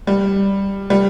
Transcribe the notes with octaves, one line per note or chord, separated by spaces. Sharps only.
G3
G3